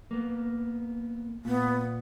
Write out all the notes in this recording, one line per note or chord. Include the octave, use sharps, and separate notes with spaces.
A#3 B3
A#2 B3